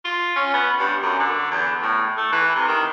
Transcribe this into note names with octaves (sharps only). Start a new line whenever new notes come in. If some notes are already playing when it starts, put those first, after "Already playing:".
F4
C#4
B3
G2
F#2
D3
E2
A2
A3
E3
C3
D#3